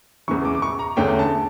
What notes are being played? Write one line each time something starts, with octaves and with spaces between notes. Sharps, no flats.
E2 C#3 E3 C#6
D6
D6
C#6
A#5
E2 D3 A3 C#4 G5
A5